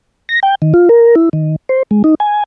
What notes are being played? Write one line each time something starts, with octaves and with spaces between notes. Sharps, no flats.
A#6
G5
D#3
F4
A#4
E4
D#3
C5
G#3
D#4
G#5